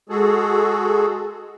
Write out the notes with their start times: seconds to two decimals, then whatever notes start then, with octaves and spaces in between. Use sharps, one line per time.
0.09 G#3 F#4 G#4 A4